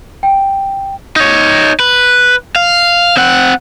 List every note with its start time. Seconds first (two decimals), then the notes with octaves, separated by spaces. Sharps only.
0.23 G5
1.16 D#4 C#5
1.80 B4
2.56 F5
3.17 C4 F#5